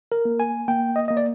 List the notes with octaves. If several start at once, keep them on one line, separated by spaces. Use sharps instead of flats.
A#4
A#3
G#5
A#3 G5
D#5
A#3 D#5
D5